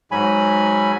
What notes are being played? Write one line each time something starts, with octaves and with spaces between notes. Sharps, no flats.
G#2 F#3 G#5 B5